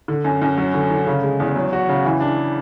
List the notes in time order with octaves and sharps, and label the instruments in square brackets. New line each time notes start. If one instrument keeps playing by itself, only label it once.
[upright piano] D3
F#2
F#2
F#3
D3
D3
C#3
G#3
E2
F#3
F#4
C#3
E3
D4